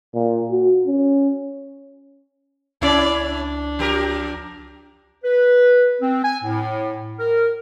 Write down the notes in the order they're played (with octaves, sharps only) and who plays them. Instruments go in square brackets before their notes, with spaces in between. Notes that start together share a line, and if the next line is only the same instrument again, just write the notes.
[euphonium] A#2
F#4
C#4
[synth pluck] C#2 [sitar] C#4 E4 [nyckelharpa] D5
[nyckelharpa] D4
[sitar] F3 G4 A#4
[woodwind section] B4
C4
G#5
A2
A#4